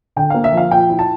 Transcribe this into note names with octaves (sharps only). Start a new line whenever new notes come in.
D3 G5
A#3 F5
E5
F3 F5
A#2 G5
E4
A5